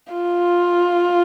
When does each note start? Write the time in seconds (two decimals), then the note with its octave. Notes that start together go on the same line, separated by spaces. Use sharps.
0.12 F4